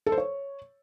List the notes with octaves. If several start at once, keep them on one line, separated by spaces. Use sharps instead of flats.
A4
C5
C#5